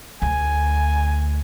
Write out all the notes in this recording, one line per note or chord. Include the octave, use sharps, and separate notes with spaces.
D2 G#5